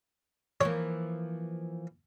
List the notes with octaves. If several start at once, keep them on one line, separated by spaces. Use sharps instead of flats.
E3 F3 A#3 C#5